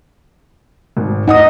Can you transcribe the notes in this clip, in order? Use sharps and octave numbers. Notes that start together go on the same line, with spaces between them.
G#1
D#4 D#5 F#5 D#6